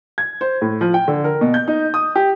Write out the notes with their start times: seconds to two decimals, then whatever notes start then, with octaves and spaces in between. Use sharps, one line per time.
0.18 G#6
0.41 C5
0.62 A2
0.81 F3
0.94 G5
1.08 D3
1.24 A#4
1.41 B2
1.54 G6
1.68 D#4
1.94 D#6
2.16 G4